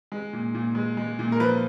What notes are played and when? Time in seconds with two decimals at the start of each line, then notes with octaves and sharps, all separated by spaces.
0.12 G#3
0.33 A#2
0.55 A#2
0.75 G#3
0.97 G#3
1.19 A#2
1.32 A#4
1.40 F3 B4